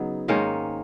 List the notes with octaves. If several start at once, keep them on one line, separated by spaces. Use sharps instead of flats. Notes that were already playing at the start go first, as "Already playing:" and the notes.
Already playing: C#3 F#3 B3 D#4
G#2 D#3 A#3 C#4